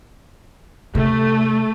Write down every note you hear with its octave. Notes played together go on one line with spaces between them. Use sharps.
C3 A3